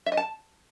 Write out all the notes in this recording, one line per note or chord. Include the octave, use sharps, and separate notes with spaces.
E5
D#5
A5